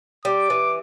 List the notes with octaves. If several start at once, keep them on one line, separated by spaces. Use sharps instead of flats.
G3 D6
E3